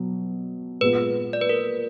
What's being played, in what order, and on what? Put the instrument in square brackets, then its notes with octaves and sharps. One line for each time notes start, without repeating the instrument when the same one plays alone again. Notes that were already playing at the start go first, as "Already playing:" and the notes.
Already playing: [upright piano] B2 F#3
[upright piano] A#2 G#3 B3 F4 [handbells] B4
[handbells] D5
B4
A#4